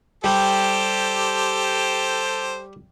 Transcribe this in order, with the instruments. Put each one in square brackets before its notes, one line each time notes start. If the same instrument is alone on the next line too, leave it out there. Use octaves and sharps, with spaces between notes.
[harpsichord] G3 [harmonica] G4 A4 C5